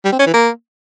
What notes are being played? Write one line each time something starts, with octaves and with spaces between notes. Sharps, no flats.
G3
C4
C#4
E3
A#3